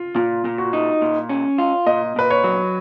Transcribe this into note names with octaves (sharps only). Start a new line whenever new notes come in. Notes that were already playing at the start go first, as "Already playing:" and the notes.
Already playing: F4
A#2 F4
A#2
F#4
D#4
A#2
C#4
F4
A#2 D#5
A#2 B4
C#5
F#3